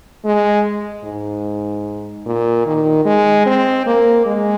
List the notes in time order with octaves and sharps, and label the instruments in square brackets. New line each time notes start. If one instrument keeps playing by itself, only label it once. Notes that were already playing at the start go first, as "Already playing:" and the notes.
[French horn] G#3
G#2
A#2
D#3
G#3
C4
A#3
G#3